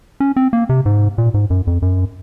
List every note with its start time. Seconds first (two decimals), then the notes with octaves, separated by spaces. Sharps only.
0.20 C#4
0.36 C4
0.53 A#3
0.69 C3
0.86 G#2
1.18 A#2
1.34 G#2
1.50 F#2
1.67 F2
1.82 F#2